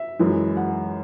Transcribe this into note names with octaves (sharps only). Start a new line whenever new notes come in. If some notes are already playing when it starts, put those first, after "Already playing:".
Already playing: E5
F#2 E3 G#3
F#5